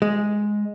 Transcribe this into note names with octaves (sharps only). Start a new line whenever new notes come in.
G#3